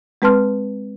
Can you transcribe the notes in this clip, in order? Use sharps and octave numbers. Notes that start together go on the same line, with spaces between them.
G#3 C4 B4 A5 C6 F6